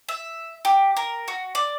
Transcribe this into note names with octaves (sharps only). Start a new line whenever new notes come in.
E5
G4
A#4
F#4
D5